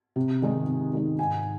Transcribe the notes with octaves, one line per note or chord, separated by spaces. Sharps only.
C3
D#3 G#3 D#4
C3
D#3 G#3 D#4
G#2 G#5